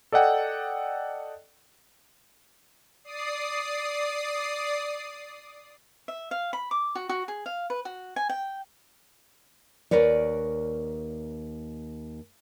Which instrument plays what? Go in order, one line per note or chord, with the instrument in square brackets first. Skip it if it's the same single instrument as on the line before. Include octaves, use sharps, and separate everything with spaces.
[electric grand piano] A4 D5 D#5 F#5 G5
[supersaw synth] D5 D#6 C7
[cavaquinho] E5
F5
B5
D6
F#4
F#4
G#4
F5
B4
F#4
G#5
G5
[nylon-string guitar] D#2 A#2 A#4 B4 C#5 D5